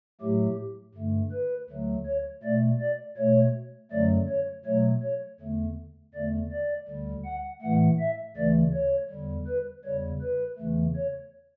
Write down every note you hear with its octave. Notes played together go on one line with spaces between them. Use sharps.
A2 F#3 A3 G4
G2 D3 A3
B4
D2 D3 F#3 A3
C#5
B2 A3 D5
D5
B2 A3 C#5
F#2 D3 F#3 A3 D5
C#5
B2 F#3 A3 C#5
C#5
E2 D3 A3
E2 D3 A3 D5
D5
D2 D3 G3
F#5
A2 E3 A3 F#5
E5
D2 C#3 E3 A3 D5
C#5
E2 D3 G3
B4
E2 C#3 G3 C#5
B4
E2 C#3 E3 A3
C#5